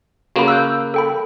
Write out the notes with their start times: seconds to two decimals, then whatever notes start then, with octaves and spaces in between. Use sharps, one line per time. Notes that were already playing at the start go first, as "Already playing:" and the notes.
0.36 C#3 A#3 F#4 G#4 B5
0.48 E6 F#6 G6
0.94 A4 G5 B5